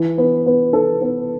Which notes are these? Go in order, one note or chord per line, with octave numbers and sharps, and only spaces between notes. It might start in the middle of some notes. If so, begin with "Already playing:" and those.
Already playing: E3
B3
B3
A4
B3